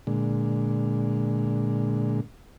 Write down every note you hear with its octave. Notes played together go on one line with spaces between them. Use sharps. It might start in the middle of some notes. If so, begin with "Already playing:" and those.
A#2 D3 G#3